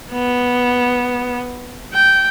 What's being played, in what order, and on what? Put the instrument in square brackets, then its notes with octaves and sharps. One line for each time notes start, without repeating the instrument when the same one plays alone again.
[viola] B3
G5